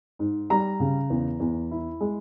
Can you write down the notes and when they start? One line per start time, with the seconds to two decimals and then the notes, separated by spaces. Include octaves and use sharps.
0.19 G#2
0.50 G3 A#5
0.80 C#3
1.10 E2
1.40 E2
1.71 E4
2.01 G#3